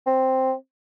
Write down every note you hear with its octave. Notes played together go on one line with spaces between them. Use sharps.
C4